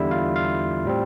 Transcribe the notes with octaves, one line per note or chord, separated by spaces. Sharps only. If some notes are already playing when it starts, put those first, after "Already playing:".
Already playing: E2 D3 G3 E4 E5
F4 F5
F4 F5
A2 G3 C4